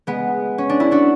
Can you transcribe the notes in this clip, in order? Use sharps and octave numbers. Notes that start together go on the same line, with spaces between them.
G#3 B3
C#4
D4
E4
D4 F#4